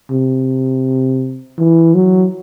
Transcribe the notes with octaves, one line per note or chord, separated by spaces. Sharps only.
C3
E3
F#3